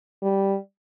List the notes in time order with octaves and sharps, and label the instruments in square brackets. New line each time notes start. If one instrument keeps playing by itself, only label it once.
[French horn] G3